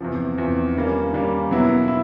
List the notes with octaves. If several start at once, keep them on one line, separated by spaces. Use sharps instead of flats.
E2 C3 F3
E2 C3 F3
D#3 G3 A#3 C#4
D#3 G3 A#3 C#4
B2 F#3 B3 E4
E4